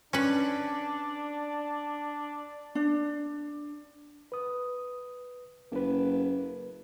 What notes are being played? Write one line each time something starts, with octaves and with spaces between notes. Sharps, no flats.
C#4 D4 B4
D4
B4 D#6
F#1 A#3 B4